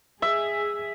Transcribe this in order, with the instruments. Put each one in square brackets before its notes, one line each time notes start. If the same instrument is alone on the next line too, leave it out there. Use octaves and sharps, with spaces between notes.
[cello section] G#4 [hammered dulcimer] E5